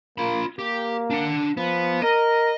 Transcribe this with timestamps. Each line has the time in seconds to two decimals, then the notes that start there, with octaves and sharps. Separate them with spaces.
0.18 A#3 F4 B5
0.59 A#3 G4
1.10 D4 F#5
1.57 F3 B3
2.03 A#4 D#5